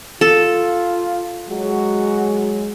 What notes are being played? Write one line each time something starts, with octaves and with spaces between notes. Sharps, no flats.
F4 A4
F#3 G#3 F#4